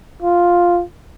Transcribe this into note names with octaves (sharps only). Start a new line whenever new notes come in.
F4